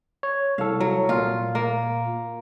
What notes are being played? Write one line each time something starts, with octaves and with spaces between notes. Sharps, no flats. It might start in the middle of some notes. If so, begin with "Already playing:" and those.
C#5
C2 A4 F5
F#3
A#2 F4
A#3